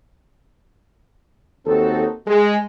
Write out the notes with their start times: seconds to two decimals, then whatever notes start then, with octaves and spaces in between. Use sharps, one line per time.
1.66 D#2 C4 D#4 F#4 A4
2.27 G#3